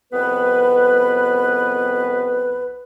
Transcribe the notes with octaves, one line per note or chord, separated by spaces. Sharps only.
C2 F2 B3 B4